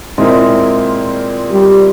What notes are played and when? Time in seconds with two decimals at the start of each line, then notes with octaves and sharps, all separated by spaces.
0.18 A#2 G#3 C4 E4 A#4
1.52 G3